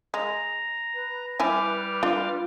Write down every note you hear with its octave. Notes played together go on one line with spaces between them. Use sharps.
G#3 A#5
B4
G3 E4 E5 G#5 D6 F6
D4 F4